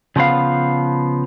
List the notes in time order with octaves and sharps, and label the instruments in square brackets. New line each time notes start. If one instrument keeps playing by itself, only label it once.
[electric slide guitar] C#3 F3 B3 F5